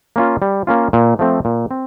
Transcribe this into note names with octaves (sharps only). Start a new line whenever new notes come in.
A#3 C#4 F4
G3
A#3 C#4 F4
A#2
F3 A3 C4
A#2
C4